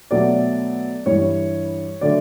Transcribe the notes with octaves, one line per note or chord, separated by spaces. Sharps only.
B2 F#3 A3 D5
G2 E3 G3 C#5
D3 F#3 A3 D5